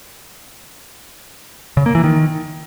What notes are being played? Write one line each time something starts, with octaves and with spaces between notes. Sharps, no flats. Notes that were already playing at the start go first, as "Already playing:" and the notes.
C#3
A#3
E3
D#3